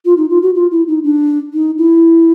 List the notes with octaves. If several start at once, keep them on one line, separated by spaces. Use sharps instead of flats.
F4
D#4
F4
F#4
F4
E4
D#4
D4
D#4
E4